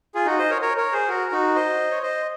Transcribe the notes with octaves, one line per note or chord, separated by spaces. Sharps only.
F4 G#4
D#4 F#4
C5 D#5
A#4 C#5
A#4 C#5
A#4 C#5
G#4 C5
F#4 A#4
D#4 F#4
C5 D#5
C#5
C5 D#5